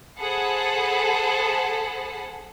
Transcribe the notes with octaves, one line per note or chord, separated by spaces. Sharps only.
G#4 A4 C5 F#5 A5 B5